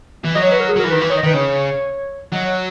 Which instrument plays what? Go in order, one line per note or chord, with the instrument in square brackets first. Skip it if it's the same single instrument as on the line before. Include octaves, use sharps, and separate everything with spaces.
[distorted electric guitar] E3
[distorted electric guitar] F#3 [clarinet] D#5
[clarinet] C#5
B4
A#4
G#4
[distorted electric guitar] F#3
[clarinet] A#4
[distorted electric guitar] E3
[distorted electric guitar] D#3 [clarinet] B4
[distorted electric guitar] E3 [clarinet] B4
[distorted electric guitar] D#3 [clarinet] C#5
[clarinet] D#5
[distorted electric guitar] D#3 [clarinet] B4
[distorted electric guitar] C#3 [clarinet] C#5
[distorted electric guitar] F#3 [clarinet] D#5
[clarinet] C#5